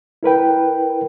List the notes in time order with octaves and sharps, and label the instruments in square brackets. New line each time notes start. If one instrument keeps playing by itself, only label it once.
[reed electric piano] E4 A#4 B4 G5